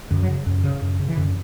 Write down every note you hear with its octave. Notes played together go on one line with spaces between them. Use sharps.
F#2 D3
F#3
C#3
F#2
C#3
F#2
C#3
E3
F#2 D3